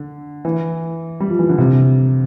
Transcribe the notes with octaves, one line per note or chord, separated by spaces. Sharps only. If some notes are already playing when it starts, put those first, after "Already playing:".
Already playing: D3
E3
G3
F3
E3
D3
C3